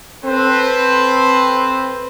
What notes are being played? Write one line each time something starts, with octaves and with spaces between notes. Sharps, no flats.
C4 A4 B4 C5